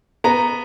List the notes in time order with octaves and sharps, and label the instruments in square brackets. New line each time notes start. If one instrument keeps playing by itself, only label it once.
[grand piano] B3 A#5